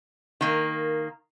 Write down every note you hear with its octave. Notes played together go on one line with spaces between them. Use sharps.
D#3 A#3